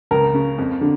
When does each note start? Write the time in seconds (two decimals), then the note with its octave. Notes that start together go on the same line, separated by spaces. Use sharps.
0.11 C#2 A#4
0.34 C#3
0.58 F2
0.81 D3